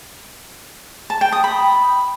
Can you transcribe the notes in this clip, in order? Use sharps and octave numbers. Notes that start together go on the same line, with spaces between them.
A5
G5
D#6
B5